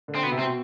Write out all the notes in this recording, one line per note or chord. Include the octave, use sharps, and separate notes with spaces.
D3
C4
B2 B3
C3
B2 C4